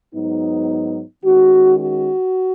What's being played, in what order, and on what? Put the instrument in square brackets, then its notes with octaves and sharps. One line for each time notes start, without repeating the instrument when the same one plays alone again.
[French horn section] G#2 F#3 B3 D#4
D#3 G#3 C#4 F#4
F#4